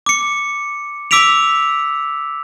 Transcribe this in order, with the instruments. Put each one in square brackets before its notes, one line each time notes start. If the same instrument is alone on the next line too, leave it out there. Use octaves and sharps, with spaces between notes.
[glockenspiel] D6 C#7
D6 E6 B6 D7 F7